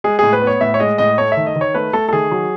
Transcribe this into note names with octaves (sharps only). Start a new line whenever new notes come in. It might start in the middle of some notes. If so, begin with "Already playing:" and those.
G#3 G#4
A2 G#4
B4
B3
C#5
A2 E5
C#5
G#3 D#5
A2 D#5
A3 C#5
D#3 E5
D#5
D#3
C#5
A3 B4
A3 A4
A4
D#3 G#4
F#3